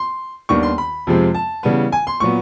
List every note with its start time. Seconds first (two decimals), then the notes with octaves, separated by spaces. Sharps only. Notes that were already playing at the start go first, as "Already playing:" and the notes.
Already playing: C6
0.49 D#2 D#3 G3 B3 D4 C#6
0.63 C6
0.78 B5
1.07 F2 C3 F3 G#3 C4
1.35 A5
1.63 C#3 E3 G3 B3
1.92 G#5
2.07 C6
2.20 A#2 F#3 B3 C#6